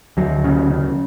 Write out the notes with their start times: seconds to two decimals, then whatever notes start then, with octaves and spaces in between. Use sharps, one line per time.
0.17 D2 F#3
0.44 C#3
0.71 C#3